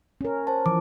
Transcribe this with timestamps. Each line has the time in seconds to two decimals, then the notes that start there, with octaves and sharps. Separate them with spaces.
0.21 C#4 A#4
0.47 C5 A5
0.66 E3 F3 D6